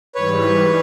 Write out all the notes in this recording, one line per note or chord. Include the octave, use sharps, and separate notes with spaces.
G#2 E3 G3 B4 C#5